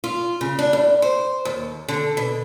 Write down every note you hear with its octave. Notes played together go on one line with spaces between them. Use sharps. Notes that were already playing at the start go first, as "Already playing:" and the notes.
F4
C#3
D4
E2
C5
D#2
D3
B2